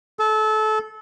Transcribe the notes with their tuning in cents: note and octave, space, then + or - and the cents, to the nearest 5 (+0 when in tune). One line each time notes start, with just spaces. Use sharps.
A4 -25